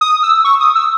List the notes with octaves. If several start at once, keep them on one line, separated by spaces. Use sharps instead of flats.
D#6
E6
C#6
D#6
E6